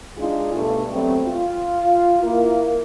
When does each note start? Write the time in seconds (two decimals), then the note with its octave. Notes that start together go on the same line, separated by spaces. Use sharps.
0.19 G#3 D4 D#4 F4 G#4
0.54 G2 B2 A3
0.92 F#3 G3 A3 B3 C4
1.27 F4
2.23 A#3 E4 A#4